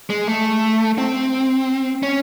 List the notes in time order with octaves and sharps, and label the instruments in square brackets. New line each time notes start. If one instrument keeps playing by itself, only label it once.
[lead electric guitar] G#3
A3
C4
C#4